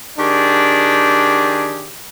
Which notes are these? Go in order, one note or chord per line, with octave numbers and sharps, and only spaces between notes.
D#3 D4 G4 G#4